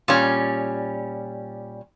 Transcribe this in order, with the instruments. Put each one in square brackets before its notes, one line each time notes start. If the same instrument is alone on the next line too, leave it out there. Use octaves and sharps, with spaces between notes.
[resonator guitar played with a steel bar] A#2 G3 C#4